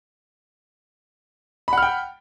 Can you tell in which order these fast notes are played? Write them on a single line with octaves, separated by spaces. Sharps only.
B5 F#5 F6 G5